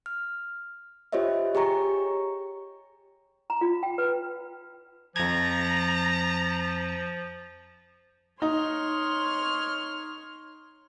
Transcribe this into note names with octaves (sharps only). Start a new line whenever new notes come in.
F6
F4 G4 C5 C#5 D#5 E5
G4 G#4 C#5 A#5 C#6
A#5
F4
G5
B4
F2 F3 A#5 G#6
D#4 C#5 C6 F6